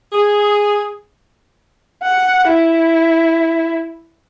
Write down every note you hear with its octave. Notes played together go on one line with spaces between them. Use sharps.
G#4
F#5
E4